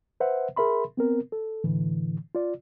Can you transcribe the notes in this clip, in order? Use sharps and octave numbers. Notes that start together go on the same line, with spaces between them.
B4 C5 E5 F#5
G#4 A#4 E5 B5 C6
B3 C4 A#4
A4
A2 D3 E3
F4 D5